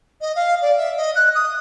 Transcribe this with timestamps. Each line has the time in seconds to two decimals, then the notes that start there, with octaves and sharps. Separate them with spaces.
0.21 D#5
0.35 F5
0.61 D5
0.77 E5
0.97 D#5
1.15 F#6
1.34 D#6